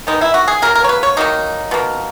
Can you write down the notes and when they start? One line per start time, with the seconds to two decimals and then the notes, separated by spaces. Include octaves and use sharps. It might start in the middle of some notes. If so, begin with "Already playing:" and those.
0.07 D#3 G#3 B3 D#4
0.21 E4
0.34 F#4
0.48 G#4
0.62 C#3 F#3 A#3 A#4
0.75 A#4
0.84 C#5
0.89 B4
1.03 C#5
1.17 D#3 F#3 A#3 D#4
1.71 B2 A#3